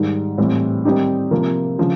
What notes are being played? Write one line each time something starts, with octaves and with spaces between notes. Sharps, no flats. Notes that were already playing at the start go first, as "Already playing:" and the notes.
Already playing: G#2 D#3 G3
A2 E3 G3 C4
D#3 G3 C4 D#4 G4
C3 F3 A#3
C#3 F3